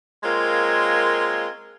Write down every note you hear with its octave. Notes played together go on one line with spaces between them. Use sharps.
G#3 A#3 C4 F4 A#4 C#5